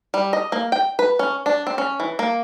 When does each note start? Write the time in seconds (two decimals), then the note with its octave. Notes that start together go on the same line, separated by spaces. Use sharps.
0.14 G3
0.33 D#5
0.52 A#3
0.72 G5
0.99 B4
1.19 C#4
1.46 D4
1.67 C4
1.78 C#4
2.00 E3
2.19 A#3